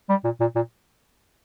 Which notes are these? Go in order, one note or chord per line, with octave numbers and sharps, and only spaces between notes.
G3
A#2
A#2
A#2